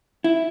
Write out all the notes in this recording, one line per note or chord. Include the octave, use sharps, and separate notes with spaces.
E4